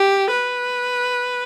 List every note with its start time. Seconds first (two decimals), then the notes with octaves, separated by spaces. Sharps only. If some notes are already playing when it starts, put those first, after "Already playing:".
Already playing: G4
0.30 B4